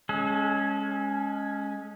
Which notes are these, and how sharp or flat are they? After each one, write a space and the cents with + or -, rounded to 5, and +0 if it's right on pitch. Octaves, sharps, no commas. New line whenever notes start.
G#3 +0 C#4 +0 A4 -35